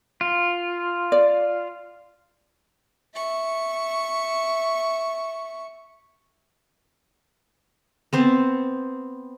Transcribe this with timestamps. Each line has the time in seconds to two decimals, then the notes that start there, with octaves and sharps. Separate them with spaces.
0.21 F4
1.12 D5
3.15 E5 C#6
8.13 B3 C4 C5 A5